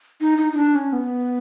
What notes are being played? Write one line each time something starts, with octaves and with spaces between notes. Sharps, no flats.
D#4
D#4
D#4
D4
C#4
B3